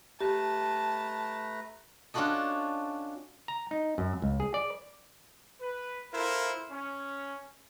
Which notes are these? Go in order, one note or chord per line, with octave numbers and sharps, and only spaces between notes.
A3 G4 B4 A5 A#5
C#4 D4 F4 F#4 A4 D#5
A#5
D#4
F#2
C#2
G#4
D5
B4
E4 F4 A4 A#4 C5
C#4